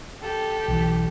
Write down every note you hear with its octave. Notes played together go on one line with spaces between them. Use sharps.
G4 A4
B1 E3